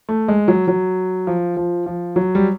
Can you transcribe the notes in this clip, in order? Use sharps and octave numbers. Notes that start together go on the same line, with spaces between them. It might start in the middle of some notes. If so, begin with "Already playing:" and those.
A3
G#3
F#3
F#3
F3
F3
F3
F#3
G3